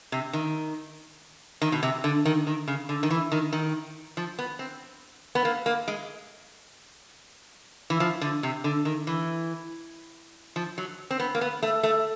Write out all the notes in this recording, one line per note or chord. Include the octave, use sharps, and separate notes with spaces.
C3
D#3
D#3
B2
C3
D3
D#3
D#3
C#3
D3
D#3
E3
D#3
D#3
F3
B3
C4
B3
A#3
A#3
G#3
E3
F3
D3
C3
D3
D#3
E3
F3
F#3
C4
B3
A#3
B3
A3
A3